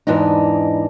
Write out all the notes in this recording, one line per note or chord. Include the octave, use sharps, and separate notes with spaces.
E2 G#2 E3 D4 D#4